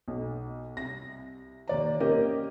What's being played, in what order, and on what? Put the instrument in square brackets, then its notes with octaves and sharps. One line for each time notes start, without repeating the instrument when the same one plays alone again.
[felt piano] B1
C2 A#6
D#2 D5 A#5
A#3 C4 C#4 G4 A#4 D#5